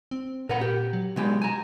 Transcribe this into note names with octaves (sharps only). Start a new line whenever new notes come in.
C4
A#2 A#4 B4 F#5
G4
F#3
B2 G#3 G4
G#5 A#5